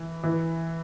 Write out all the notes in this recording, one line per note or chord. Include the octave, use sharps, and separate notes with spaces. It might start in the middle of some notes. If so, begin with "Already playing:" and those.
Already playing: E3
E3